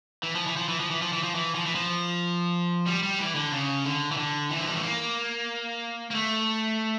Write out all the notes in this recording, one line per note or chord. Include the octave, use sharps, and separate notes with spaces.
E3
F3
E3
F3
E3
F3
E3
F3
E3
F3
E3
F3
E3
F3
G3
G3
E3
D3
C#3
D3
E3
D3
E3
F3
G3
A3
A#3
A#3
A3